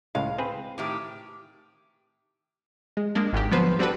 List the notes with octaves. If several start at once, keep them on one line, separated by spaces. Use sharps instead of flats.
C#2 A2 G#3 F5
C4 G#4 B4
A2 D#3 G4
G#3
G#3 A#3 D4
G#1 G#2 D#3 G4
D3 F3 F#3 B3 B4 C5
G3 C4 D4 F#4 A4 B4